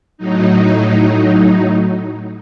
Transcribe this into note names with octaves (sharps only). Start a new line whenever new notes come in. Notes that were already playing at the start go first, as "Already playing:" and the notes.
A2 F#3 D#4